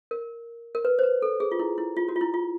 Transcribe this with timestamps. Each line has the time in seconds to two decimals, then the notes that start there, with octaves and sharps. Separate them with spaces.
0.11 A#4
0.75 A#4
0.85 B4
0.99 C5
1.03 B4
1.22 A4
1.40 G#4
1.51 F4
1.59 E4
1.78 E4
1.97 F4
2.09 F#4
2.16 F4
2.21 E4
2.34 F4